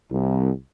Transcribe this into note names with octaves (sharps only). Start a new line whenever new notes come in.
C2